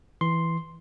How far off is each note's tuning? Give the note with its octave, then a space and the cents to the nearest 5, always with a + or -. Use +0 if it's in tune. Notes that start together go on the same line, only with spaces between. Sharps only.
E3 +0 C6 +0